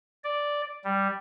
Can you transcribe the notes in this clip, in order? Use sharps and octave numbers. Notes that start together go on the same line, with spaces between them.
D5
G3